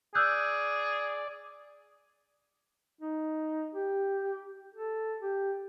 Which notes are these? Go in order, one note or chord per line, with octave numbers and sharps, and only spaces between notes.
G#4 D5 E6 F#6 G6
D#4
G4
A4
G4